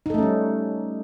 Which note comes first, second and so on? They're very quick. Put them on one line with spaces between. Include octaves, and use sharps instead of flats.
D#4 A4 A3 C#4 G3